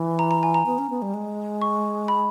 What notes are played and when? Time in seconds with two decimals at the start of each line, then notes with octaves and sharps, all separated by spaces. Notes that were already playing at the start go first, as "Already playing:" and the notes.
Already playing: E3
0.19 A#5
0.31 A#5
0.43 G#5
0.54 A#5
0.66 B3
0.78 C#4
0.90 B3
1.02 G3
1.14 G#3
1.61 C#6
2.08 B5